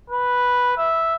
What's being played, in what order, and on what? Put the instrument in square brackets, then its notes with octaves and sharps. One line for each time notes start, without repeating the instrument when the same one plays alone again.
[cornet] B4
E5